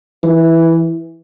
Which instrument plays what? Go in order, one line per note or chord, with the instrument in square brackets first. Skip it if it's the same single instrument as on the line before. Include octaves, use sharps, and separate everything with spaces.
[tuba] E3